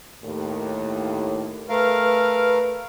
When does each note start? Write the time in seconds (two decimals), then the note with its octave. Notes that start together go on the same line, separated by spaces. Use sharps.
0.24 D#2 A2
1.69 A3 A#4 B4 F5